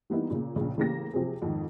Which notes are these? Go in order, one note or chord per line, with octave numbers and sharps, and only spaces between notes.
E3 G3 A#3 B3 D#4 E4
A#2 C#3 A#3
A#1 C#3
A2 C#3 E3 A#3 G4 A#6
C3 F3 F#3 C4 G#4
F2 G#2 D#3